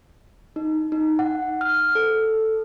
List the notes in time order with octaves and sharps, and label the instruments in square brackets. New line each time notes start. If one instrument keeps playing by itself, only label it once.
[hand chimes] D#4
D#4
F#5
F6
A4